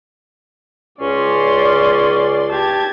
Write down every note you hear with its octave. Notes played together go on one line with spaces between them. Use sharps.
C#2 C#4 D5 C6
G4 A5 G#6